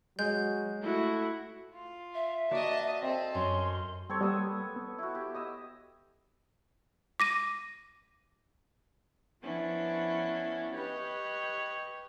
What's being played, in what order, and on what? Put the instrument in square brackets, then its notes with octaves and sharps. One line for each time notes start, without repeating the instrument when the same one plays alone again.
[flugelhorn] F#3 [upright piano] G#3 [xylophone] G6
[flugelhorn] A3 [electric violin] E4 F#4
[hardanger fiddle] F4
[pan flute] E5
[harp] A#3 F#4 D5 [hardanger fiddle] D#5 A5
[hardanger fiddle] C4 A4 [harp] D#5
[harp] F#2 [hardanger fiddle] C#4 [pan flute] C6
[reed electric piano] G3 [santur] C4 A4 C#5
[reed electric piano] G3 A#3 G4 [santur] B3 D#6 E6
[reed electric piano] B3
[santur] E4 F#4
G4
D#5 D#6 E6
[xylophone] D6 A#6 D#7
[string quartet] F3 B3 C#4 D4 E4
G4 B4 C#5 D#5